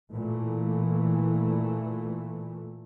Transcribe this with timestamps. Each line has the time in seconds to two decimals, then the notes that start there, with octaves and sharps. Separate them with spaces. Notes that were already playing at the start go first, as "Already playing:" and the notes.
0.13 A#2 E3 A3